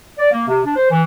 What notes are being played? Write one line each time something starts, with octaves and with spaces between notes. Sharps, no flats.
D5
A#3
C3
D4
C5
E3